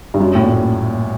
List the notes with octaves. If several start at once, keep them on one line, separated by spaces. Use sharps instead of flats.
G2
F#2
A2
A#2